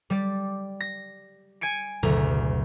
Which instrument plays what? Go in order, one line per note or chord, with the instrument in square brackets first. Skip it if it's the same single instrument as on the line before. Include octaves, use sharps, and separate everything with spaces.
[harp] G3 D5
A#6
G#5 G#6 C#7 D7
F#1 D2 B2 A#5